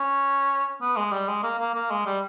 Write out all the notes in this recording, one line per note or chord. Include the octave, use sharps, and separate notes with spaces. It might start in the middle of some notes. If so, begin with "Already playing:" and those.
Already playing: C#4
B3
G#3
G3
G#3
A#3
A#3
A#3
G#3
G3